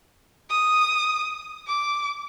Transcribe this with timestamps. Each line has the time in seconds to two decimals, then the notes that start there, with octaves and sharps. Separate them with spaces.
0.50 D#6
1.67 D6